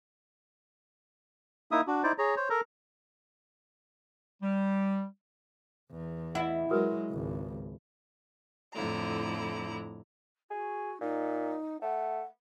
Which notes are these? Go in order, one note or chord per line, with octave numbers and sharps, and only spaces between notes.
A#3 D#4 E4 E5 D#6
D4 F#4
D#4 E4 C5 D5
G#4 C#5 A#5
C5 C#5
A4 A#4 A#5
G3
E2
E4 D#5 E5 F#5
F#3 G#3 F#4 A#4 B4
G#1 C#2
F2 A2 D3 E4 A#5
F#4 G#4
A#2 D#4
A3 F#5